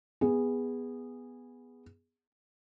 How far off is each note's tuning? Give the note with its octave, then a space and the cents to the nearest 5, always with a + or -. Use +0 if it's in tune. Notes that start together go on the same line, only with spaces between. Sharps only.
B3 +0 G#4 -15